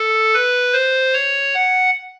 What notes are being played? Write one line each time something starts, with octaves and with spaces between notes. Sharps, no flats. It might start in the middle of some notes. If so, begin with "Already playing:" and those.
Already playing: A4
B4
C5
C#5
F#5